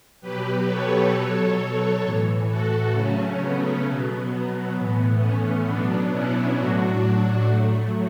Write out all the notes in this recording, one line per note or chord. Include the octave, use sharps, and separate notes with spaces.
B2 F#3 G4 B4
A4 C#5
B2 F#3
A2 E3
F#4 A4
C#3 F#3 A3 C#4
B3
B2 F#3 B3
A2 E3 B3
A3 C#4
B2 F#3 B3 D4
C#4 E4
A2 F#3 D4 F#4
A2 F#3 A3